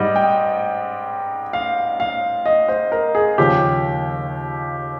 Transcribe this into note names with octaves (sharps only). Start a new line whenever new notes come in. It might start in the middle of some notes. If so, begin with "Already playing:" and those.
Already playing: G#2 G3 D#5
G5
F5
F5
D#5
C5
A#4
G#4
D#2 C#3 F3 G4